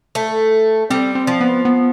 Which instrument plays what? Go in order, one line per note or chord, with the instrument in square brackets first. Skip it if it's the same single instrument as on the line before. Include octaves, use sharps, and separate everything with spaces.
[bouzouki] A3
[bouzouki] G3 [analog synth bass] C4
[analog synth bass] C4
[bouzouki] F3
[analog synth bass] B3
B3